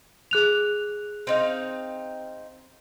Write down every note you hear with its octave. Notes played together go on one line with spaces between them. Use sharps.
G#4 F#6 F7
C4 D#4 F5